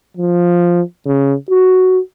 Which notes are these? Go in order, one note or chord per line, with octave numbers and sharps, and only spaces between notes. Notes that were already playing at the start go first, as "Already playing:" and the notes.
F3
C#3
F#4